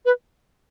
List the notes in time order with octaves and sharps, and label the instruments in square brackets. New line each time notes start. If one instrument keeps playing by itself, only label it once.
[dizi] B4